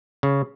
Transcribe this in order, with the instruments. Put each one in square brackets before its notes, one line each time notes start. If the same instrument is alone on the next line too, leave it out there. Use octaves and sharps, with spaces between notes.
[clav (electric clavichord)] C#3